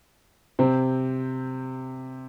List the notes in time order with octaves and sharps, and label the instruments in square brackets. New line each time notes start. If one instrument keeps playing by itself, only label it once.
[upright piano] C3 C4